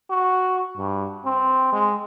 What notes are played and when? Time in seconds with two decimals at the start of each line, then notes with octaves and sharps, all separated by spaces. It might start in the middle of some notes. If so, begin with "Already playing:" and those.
0.10 F#4
0.78 G2
1.25 C4
1.73 G#3